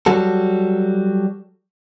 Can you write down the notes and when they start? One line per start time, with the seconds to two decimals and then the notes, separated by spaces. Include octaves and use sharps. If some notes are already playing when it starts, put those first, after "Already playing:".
0.06 F#3 G3 F#4 A4